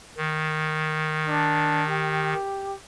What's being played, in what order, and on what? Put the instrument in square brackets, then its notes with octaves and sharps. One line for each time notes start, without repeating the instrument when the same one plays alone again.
[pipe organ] D#3
[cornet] D4
G4